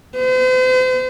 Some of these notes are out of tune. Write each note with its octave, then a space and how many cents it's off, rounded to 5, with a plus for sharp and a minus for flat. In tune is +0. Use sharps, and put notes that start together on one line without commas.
C5 -40